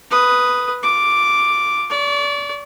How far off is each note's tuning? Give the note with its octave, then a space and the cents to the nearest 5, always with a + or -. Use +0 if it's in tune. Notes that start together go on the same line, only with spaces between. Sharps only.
B4 +0 D#6 +0
F4 +10 D6 +0
D5 -30 C#6 +0